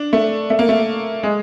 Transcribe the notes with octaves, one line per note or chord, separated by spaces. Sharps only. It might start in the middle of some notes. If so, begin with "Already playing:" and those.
Already playing: D4
A3
A3
A#3
A3
G#3